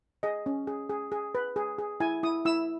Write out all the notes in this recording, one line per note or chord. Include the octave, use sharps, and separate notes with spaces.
G#4 D#5
C#4
G#4
G#4
G#4
B4
G#4
G#4
E4 G#5
E4 D#6
E4 E6